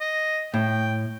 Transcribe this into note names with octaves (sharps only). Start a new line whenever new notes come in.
D#5
A2 G5